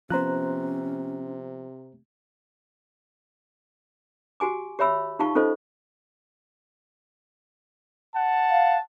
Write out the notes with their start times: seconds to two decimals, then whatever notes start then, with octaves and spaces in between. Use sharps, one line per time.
0.10 C3 F3 B3 C#4 C5 A#5 F#6
4.40 F#4 G4 G#5 D6
4.79 G4 C#5 E5 B5 E6
5.19 D#4 F4 G4 F5 A5 C#6
5.35 C#4 D#4 F4 A4 C5 D#5
8.16 F#5 A5
8.51 F5